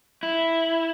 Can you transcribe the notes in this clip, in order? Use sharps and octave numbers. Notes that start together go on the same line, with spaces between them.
E4